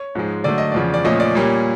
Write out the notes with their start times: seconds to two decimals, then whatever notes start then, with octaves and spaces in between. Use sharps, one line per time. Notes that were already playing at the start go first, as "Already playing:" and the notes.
Already playing: C#5
0.15 G#2 F3 G#3
0.44 D3 F#3 A3 D5
0.58 D#5
0.72 E2 C#3 F3 D5
0.94 D5
1.04 A#2 F3 A3 C#4 D#5
1.20 D5
1.35 A#2 G3 A#3 C#4